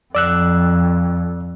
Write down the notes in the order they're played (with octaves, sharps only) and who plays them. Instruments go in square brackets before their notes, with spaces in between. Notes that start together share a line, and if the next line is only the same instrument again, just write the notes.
[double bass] F2 [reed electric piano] D5 E6 F#6